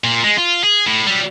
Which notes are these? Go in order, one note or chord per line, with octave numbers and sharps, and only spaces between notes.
A#2
G#3
F4
G#4
A2
F#3 G3